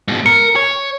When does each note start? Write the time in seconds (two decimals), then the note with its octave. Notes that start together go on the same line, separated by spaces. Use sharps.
0.08 G#2 B2
0.26 A#4 C#7
0.56 C#5